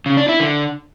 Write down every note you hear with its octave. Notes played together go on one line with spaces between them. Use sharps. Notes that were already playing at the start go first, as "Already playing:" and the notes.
C#3
D4
E4
D3